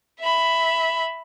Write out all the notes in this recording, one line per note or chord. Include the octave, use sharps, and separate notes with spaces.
E5 B5